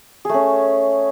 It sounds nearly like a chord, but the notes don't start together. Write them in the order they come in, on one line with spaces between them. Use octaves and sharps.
G#4 A3 C#4